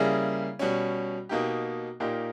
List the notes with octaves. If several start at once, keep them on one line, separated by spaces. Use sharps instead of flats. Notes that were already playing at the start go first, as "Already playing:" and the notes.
Already playing: C#3 G3 A#3 E4 G#4
B2 G3 C#4
B2 A#3 D#4 G4
A#2 A#3 D#4 G4